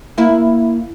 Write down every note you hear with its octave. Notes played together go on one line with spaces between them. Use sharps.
A#3 E4